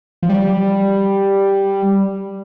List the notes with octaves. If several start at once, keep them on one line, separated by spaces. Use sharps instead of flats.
F3
G3